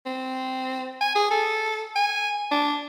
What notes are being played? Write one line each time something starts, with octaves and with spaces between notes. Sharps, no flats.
C4
G#5
G#4
A4
G#5
D4